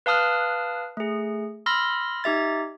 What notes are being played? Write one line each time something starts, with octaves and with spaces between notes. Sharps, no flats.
B4 F5 A5 D#6 F6 F#6
A3 G#4
B5 C6 E6 F6 A#6
D#4 G4 E5 A6